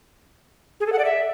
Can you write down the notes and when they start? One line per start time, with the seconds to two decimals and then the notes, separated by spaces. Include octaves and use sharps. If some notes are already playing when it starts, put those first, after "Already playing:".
0.80 G#4
0.86 A4
0.93 F#5
0.99 D5
1.05 E5